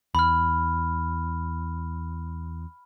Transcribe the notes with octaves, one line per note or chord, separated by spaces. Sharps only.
E2 B5 F6